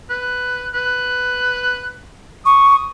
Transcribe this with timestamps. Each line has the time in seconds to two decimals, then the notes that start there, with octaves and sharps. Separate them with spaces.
0.10 B4
0.74 B4
2.45 C#6 D#6